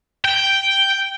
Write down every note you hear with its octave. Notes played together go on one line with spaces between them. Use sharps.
G5